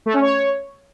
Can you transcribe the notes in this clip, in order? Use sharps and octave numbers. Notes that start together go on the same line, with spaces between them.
A3
C#4
C#5